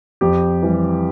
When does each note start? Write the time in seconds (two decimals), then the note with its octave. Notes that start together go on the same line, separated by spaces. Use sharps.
0.21 F2 G4
0.62 E3 G3